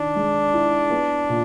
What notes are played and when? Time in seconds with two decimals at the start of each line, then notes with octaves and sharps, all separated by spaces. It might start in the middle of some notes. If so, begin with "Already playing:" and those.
Already playing: D#3 D4
0.16 G#3
0.53 E4
0.91 B3
1.29 A#2